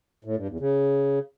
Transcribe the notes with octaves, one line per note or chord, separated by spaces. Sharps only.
A2
G2
E2
C#3